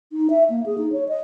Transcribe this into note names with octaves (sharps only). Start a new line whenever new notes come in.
D#4
E5
A#3
G#4
D#4
C#5
D#5